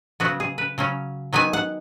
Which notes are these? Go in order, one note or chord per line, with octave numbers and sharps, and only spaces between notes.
C#3 F#3 B3 F#4
G#4
B4
C#3 F#3 C#4
D#3 F#3 B3 G#5
F#5